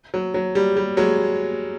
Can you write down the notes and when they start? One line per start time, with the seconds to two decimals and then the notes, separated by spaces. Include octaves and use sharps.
0.14 F#3
0.34 F#3
0.55 G3
0.77 G3
0.97 F#3 G#3